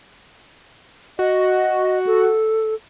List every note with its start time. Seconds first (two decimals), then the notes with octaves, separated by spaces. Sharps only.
1.19 F#4 D#5
2.07 A4